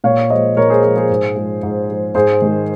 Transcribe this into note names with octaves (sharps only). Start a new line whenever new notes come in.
A#2 C#5 F5
F3 G#3 C5 D#5
A#2 A#4 C#5
G#4 C5
F3 G#3 G#4 C5
G#4 C5
G#2
F3 G#3
G#2
F3 G#3
G#2 G#4 C5
D#3 G#3